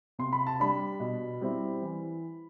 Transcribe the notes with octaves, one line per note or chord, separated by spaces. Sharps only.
C3 C6
B5
A5
G3 D4 B5
B2
G3 C4 E4
E3